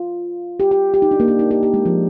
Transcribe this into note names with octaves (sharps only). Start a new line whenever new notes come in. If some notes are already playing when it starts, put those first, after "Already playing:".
Already playing: F4
G4
G4
G4
D#4
D4
A#3
D4
D#4
G4
G4
G#3
F3